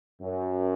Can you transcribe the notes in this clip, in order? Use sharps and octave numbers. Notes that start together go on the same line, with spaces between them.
F#2